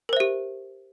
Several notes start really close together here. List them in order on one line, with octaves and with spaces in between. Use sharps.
A#4 C5 E5 G4